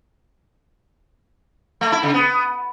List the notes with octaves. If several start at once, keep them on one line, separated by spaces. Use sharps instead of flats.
A3
E4
C#3
B3